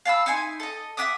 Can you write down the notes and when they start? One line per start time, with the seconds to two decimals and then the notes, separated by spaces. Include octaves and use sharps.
0.05 F5 A5 B5 E6
0.26 D#4 E4 G#5 C6
0.60 A4 D#5
0.97 E5 F#5 D6 D#6